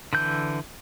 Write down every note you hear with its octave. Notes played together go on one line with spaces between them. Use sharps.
D3 E3 G6